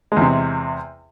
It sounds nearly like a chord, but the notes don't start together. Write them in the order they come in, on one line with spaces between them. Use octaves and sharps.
G#3 E2 C3